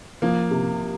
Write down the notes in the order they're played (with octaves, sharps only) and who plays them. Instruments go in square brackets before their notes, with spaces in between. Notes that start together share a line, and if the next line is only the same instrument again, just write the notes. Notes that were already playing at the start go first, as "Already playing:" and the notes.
[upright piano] F3 [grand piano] A#3
[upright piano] C3